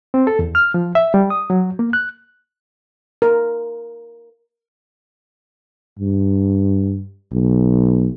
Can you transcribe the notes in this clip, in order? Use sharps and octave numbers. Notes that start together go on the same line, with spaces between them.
C4
A4
E2
F6
F3
E5
G3
D#6
F#3
A#3
F#6
A#4
G2
B1